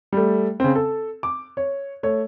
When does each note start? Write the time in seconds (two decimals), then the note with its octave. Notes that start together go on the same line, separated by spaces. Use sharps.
0.12 G3 A3
0.60 C#3 C4
0.75 A4
1.23 D6
1.57 C#5
2.03 A3 C#5